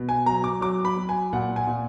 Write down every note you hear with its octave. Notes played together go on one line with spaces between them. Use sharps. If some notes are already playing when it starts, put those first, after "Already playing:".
Already playing: B2
G#5
F#3 A#5
D6
F#3 D6
B5
F#3
G#5
A#2 F#5
G#5
A#2